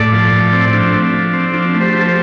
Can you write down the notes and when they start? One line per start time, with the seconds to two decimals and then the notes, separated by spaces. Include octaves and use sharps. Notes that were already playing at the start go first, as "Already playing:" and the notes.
Already playing: A2 A4 D5
0.12 F3
0.32 A2
0.53 C4
0.73 F3 D4
0.93 A3
1.13 F3
1.33 C4
1.54 F3 D4
1.74 A3
1.80 G4 C5
1.93 F3 G4
2.00 A4
2.08 G4 C5